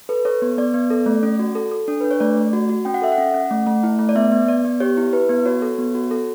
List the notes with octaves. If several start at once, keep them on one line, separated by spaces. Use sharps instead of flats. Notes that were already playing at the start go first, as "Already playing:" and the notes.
A4 B4
A4 C#5
B3
B3 D5
B3
A4
A3
C#4
F#4
A4
A4
D4
D4 B4
C#5
A3 D5
A3
F#4
F#4
C#4 G5
F#5
A4 E5
F#5
C#4
C#4
A3
A3
E4
A3
D5
B3 E5
B3
B3 D5
B3
G4 C#5
E4
E4 B4
B3
F#4 C#5
A4
B3
F#4
A4